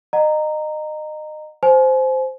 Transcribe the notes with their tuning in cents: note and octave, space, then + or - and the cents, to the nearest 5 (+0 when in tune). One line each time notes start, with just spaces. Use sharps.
D#5 -25 F#5 +0 A#5 -10
C5 -5 G#5 +40